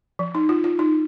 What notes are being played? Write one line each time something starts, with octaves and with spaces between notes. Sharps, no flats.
F3
D#4
F4
F4
D#4